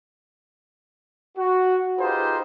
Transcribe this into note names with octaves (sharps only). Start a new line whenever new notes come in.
F#4
D#4 F4 G4 G#4 B4 C5